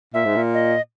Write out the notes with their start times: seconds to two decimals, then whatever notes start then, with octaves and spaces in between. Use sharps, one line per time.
0.14 A#2 E5
0.25 G#2
0.36 A#2
0.54 D#5